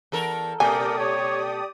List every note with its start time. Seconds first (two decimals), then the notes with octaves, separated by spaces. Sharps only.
0.12 E2 A4 A#4
0.60 B2 A3 G4 A#4 D5 G#5 D#6
0.99 C#5